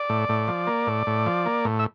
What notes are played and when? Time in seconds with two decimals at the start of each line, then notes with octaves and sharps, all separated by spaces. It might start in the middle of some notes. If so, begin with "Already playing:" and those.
Already playing: D5
0.09 A2
0.29 A2
0.48 F3
0.67 A#3
0.87 A2
1.07 A2
1.26 F3
1.46 A#3
1.65 A2
1.79 E5